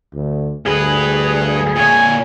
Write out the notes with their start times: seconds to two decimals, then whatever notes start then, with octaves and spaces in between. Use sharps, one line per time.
0.14 D2
0.66 D2 G2 G#4 B4
1.76 A#2 C#5 G#5